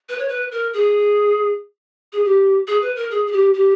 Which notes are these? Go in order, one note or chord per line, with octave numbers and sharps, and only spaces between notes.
B4
C#5
B4
A#4
G#4
G#4
G4
G#4
B4
A#4
G#4
G#4
G4
G4